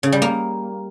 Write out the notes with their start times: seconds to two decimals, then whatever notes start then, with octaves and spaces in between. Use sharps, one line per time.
0.03 C#3
0.12 G3
0.22 A#3